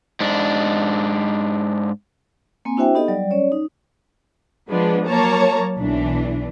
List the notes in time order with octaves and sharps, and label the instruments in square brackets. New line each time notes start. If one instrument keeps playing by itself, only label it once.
[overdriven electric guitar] G#2 D4
[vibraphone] A#3 C4 G#5
D4 E4 F#4 C5 E5 G5
B3 D#4 G4 A4 D#5
F#3 G3 D5
C#4 C#5 D5
D#4
[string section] F3 G#3 B3 D4
F#3 A#3 C#5 A5 A#5
B1 E3 D4